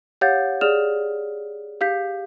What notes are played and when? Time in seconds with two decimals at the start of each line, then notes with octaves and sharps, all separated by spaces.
0.21 G4 C#5 F5 F#5 G6 A6
0.61 G#4 D5 F6 E7 F7
1.81 G4 F5 G6 B6